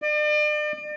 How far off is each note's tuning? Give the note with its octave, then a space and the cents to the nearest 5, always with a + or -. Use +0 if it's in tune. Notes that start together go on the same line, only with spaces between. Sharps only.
D5 +40